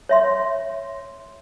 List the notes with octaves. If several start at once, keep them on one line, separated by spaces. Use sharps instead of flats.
C#5 E5 C6